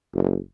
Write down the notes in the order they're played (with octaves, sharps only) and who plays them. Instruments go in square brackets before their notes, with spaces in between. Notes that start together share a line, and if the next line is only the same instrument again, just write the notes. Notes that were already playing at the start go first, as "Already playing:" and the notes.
[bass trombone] F#1